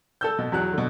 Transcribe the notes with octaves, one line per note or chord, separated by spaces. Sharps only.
A4 E6 G6
B2
E2 F#3 F#6
B2 D3